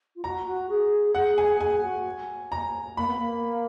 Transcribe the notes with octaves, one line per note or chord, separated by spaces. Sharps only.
F4
F#4 A#5
F#4
G#4
G#4 F#5
G#5
G#4 G#5
F#4
A#5
A#3 B5
B3
A#3